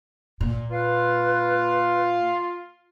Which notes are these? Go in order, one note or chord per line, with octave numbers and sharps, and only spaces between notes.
A#2
F4 B4